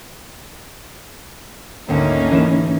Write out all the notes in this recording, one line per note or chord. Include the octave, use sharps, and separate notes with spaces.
G#1 D2 A#3 C#4 D#4
E3 E7